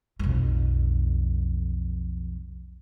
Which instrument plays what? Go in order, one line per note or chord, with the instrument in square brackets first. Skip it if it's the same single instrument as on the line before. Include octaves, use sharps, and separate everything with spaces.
[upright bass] B1 F2